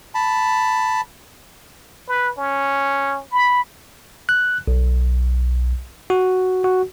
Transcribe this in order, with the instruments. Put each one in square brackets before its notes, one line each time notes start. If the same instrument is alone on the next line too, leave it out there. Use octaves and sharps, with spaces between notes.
[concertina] A5 B5
[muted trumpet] B4
C#4
B5
[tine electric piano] F#6
B1
F#4
F#4